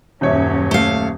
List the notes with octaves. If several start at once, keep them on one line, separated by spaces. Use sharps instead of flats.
D#1 F#2 F#3 C#4 C#5 E5
A3 F5